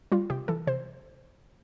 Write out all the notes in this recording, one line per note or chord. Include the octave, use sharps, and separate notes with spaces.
G3 F4
C3 G4
E3 A4
C3 C5